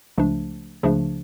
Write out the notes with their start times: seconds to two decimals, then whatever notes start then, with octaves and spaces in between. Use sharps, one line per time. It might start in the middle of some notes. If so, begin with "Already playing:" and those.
0.18 C#2 C#3 F3 A3 D4
0.83 C#2 C#3 F3 A3 D4